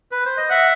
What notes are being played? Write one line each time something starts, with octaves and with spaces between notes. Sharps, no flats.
B4
C5
D#5
E5 F#5